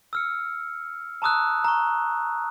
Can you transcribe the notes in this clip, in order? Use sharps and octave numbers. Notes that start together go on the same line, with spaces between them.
E6 F6 C#7
A5 A#5 C#6 D#6 E6 F#6
A#5 C#6